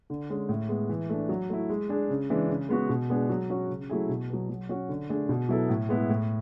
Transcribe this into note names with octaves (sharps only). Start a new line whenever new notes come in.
D3
G#3 C#4
A2
G#3 B3
E3
A3 D4
F#3
A3 E4
G#3
D4 G#4
C#3
E3 G#3 D4
C#3
G#3 B3 F#4
B2
G#3 B3 D4 G#4
F#3
C#4 F#4
C#3
F#3 A3 E4 G#4
B2
F#3 B3
F#3
C#4 F#4
D3
A3 D4 G#4
B2
F#3 B3 E4 A4
A2
G#3 B3 E4 G#4
A2